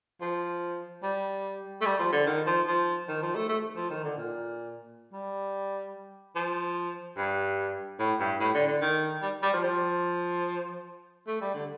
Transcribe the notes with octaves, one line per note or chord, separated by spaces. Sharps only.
F3
G3
A3
G3
F3
D3
D#3
F3
F3
D#3
F3
A3
A3
F3
D#3
D3
A#2
G3
F3
G2
A2
G2
A2
D3
D3
D#3
G3
G3
F3
F3
A3
G3
D3